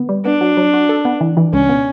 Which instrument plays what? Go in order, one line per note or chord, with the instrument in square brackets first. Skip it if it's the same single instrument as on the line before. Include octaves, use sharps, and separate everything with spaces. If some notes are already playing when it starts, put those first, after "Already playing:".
Already playing: [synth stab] D3 B3
G3
[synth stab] B3 [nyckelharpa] D4
[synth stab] F#3
F#3
F#4
A4
B3
E3
E3
[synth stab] C#2 [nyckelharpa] C#4
[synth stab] B2